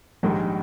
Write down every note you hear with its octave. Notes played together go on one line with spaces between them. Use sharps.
A#1 G#2 D#3 G3